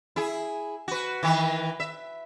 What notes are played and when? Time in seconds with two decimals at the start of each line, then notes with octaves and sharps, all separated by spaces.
0.16 E4 G#4
0.88 F#4 B4
1.23 D#3 E3 B4
1.80 E5